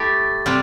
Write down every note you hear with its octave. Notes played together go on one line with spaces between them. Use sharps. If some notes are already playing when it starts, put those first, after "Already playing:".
Already playing: A3 E4 G4 A6
C3 G3 C4